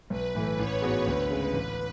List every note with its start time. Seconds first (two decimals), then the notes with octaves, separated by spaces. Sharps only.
0.10 B1 B4
0.35 A2 E3 A3
0.58 A1 C#5
0.82 G#2 G#3 B3 F#4
1.06 D2 B4
1.30 C#3 G#3
1.54 A1